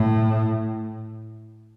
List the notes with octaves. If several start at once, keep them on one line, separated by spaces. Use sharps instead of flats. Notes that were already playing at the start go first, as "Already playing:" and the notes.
Already playing: A2